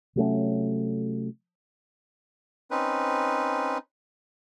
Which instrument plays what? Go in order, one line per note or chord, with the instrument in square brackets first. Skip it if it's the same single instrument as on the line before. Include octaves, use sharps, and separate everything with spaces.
[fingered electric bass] C3 F#3 A3 C#4
[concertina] C4 C#4 D#4 B4